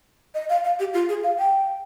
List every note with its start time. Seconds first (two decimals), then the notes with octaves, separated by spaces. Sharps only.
0.35 D#5
0.49 F5
0.64 F5
0.80 G4
0.94 F4
1.09 G#4
1.23 F5
1.39 G5